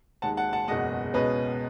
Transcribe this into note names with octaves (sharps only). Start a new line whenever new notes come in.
D#2 D#3 G#3 F#5 A5
F#5 A5
F#5 A5
F#1 E2 B2 G#3 D#5 F#5
C#2 B2 G#3 C#4 B4 D#5